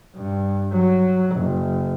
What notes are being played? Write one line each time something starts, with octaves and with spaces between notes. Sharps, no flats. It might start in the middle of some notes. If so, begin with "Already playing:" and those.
G2
F#3
F#1